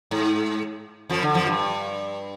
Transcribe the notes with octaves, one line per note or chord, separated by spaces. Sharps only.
G#2
F2 F3
D3
F2 F3
G2